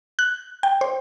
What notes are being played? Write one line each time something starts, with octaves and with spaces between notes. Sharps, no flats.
F#6
G5
C5